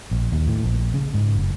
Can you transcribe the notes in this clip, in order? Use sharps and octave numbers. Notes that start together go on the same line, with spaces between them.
A#1
D#2
A2
A#1
C#3
G#2
F#1